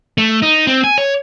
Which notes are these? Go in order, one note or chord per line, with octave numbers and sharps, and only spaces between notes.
A3
D#4
C4
G#5
C#5